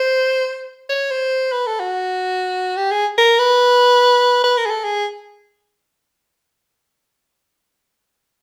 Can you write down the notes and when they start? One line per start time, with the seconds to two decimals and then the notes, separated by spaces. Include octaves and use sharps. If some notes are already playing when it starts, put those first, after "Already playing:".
Already playing: C5
0.89 C#5
1.11 C5
1.52 B4
1.66 A4
1.80 F#4
2.77 G4
2.91 G#4
3.18 A#4
3.39 B4
4.44 B4
4.57 A#4
4.66 G#4
4.70 A4
4.84 G#4